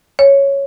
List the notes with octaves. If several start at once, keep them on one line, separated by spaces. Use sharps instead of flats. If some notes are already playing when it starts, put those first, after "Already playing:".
C#5